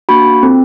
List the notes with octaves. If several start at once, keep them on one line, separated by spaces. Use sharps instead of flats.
A#3 D4 F#4 B5
C4 F4 A4